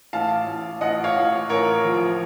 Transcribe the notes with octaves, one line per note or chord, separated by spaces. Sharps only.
A1 F5 A5
A1
A1 D#5 F#5
C#5 F5
A1
A1 A#4 C#5
F3